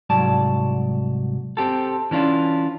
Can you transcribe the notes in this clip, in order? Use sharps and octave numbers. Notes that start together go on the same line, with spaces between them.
C2 G#2 F#3 D5 A5
C4 G4 A4
E3 C#4 D4 F4